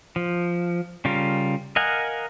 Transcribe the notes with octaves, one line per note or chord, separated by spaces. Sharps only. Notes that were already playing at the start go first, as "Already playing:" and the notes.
F3
C#3 G3 F4 A#4
A#4 D#5 F5 F#5 G#5